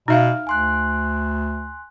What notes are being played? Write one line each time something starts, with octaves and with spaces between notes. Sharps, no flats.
B2 D#4 E5 F5 F6
D2 G#5 C6 F#6